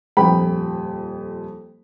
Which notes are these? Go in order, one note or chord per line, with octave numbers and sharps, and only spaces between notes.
D#1 F2 G5 B5